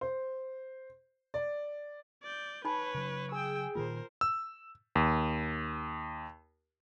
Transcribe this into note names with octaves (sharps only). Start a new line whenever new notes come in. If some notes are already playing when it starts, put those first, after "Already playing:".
C5
D5
D5 G6
D#4 B4 C#5 G#5 B5
C#3 F#3
G#4 G5 E6
A#2 D#3 A#3 F4 A#4 C5
E6
D#2